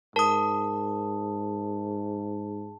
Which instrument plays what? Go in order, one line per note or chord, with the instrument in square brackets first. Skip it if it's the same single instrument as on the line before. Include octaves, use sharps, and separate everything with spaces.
[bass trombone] G#2 [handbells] A#4 D#6 [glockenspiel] A5